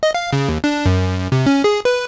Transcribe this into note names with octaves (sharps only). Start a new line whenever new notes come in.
D#5
F5
C#3
D#2
D4
F#2
C3
C#4
G#4
B4